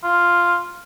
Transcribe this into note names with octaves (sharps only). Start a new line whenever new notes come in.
F4